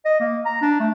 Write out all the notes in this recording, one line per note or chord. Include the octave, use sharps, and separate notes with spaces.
D#5
A#3
A#5
D4
A3